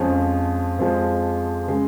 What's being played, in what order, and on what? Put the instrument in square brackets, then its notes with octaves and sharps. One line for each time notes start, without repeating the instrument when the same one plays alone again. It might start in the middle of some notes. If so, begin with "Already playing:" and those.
Already playing: [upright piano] F2 F3 G#3 C#4
F2 F3 G#3
C#3 G#3